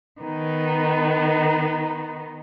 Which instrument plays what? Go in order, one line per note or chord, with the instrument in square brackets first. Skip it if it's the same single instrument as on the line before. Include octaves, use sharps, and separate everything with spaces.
[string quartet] D#3 B3 D#4